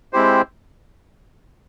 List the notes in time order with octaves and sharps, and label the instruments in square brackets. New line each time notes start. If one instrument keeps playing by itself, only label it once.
[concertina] G#3 C4 E4 G4 C5